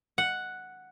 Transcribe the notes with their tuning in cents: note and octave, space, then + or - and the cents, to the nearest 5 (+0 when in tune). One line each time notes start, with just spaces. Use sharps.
F#5 +0